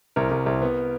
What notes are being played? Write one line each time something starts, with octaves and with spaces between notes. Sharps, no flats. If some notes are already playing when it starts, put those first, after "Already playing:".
C2 A#4
C2
C2
B3